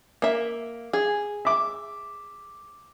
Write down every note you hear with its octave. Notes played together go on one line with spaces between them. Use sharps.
A#3 E5
G#4
E5 D6